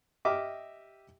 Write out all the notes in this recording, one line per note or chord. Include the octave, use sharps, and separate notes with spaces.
G4 D#5 E5 D6 F6